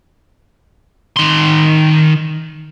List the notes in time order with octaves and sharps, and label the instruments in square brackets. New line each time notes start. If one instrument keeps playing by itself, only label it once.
[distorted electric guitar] D#3 C6